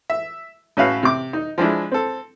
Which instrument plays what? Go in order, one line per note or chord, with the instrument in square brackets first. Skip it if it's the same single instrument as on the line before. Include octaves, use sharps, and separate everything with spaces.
[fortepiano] E5
A2 C#4 F#4 B4 E5 F5
C3 D6
D#4
F3 G#3 D4 E4
C4 A4